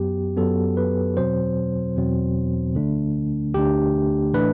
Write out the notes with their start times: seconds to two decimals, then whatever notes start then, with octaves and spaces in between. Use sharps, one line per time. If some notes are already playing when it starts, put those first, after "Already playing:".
Already playing: F#2 F#3 B3 G4
0.37 F#2 F#3 B3 A4
0.77 B4
1.17 E2 B2 F#3 C4 C5
1.96 E2 B2 F#3 C4
2.75 D2 D3 A3 D4
3.54 D2 D3 A3 D4 G4
4.33 A2 E3 A3 D4 B4